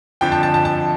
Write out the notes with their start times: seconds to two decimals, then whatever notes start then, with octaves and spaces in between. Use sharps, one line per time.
0.21 F2 D3 F3 G5
0.32 A5
0.43 A5
0.54 A5
0.65 A5